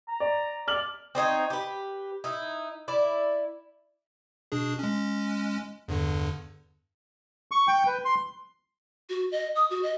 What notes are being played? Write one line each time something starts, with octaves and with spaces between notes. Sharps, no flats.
A#5
D5
D5 F6 F#7
C4 D4 D#4 C#5
G4 B4
D#4 E4
E4 D5
B2 D4 G#4
G#3 C#4
E2 G2 D3
C#6
G5
B4
C6
F#4
D#5
D#6
F#4
D#5